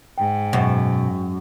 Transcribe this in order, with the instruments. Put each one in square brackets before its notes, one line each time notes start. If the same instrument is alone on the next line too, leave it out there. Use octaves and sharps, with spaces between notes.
[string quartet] G#2 [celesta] G5
[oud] F#2 [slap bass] B2